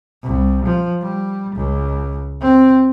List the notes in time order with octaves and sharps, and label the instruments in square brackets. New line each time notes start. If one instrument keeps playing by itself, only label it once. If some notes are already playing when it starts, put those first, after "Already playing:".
[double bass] C2
F3
G3
C#2
C4